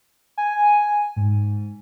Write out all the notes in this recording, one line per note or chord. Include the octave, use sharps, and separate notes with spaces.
G#5
G#2